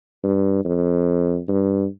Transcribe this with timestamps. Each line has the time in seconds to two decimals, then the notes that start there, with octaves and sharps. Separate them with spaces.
0.24 G2
0.65 F2
1.48 G2